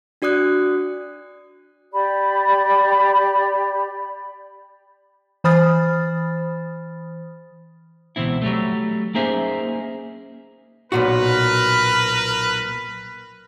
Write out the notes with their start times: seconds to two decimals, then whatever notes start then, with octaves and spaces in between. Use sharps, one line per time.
0.22 D4 F#4 D5 D#6 F#6 C#7
1.92 G4 D5 B5
5.44 E3 C5 B5 D#6 F6 A6
8.16 C#2 B2 E3 C4 E4
8.42 F#3 G3 A3
9.15 A#3 C#4 D#4 G#4 C5 E5
10.92 B1 A#2 F#4 A#4 B4